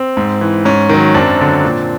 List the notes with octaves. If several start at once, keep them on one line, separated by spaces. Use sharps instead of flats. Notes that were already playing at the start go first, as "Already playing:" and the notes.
Already playing: C4
G#2
E3
G#2 C#4
D#3 F#3
F#2 C4 D4
D3 F#3
A#2